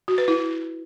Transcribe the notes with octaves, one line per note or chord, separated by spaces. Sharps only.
F#4
B4
E4